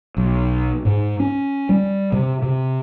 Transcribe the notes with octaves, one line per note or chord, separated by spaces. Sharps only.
B1
G#2
C#4
G3
C3
C3